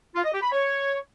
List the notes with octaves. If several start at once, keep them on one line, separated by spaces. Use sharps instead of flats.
F4
D#5
G4
B5
C#5